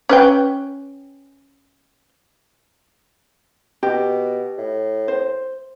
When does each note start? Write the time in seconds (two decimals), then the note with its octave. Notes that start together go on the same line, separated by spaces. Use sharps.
0.09 C#4 B4 G5
3.83 B2 G4
4.58 A2
5.08 C5